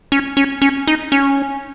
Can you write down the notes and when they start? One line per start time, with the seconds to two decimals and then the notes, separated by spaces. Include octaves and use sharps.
0.12 C#4
0.37 C#4
0.62 C#4
0.87 D#4
1.12 C#4